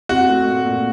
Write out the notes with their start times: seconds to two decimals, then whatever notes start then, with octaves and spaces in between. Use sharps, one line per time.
0.09 C4 F#4
0.29 A3
0.47 A#2
0.66 A#2